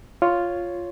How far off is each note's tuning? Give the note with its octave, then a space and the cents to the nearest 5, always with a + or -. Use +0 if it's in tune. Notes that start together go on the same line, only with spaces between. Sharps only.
F4 +0 C#5 +0